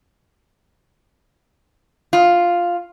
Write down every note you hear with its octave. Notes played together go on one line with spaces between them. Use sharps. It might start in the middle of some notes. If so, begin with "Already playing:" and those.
F4